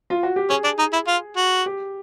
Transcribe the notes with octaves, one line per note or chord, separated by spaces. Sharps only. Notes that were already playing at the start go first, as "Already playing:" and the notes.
F4
F#4
G4
C#4 G#4
D4
D#4
E4
F4
F#4
G4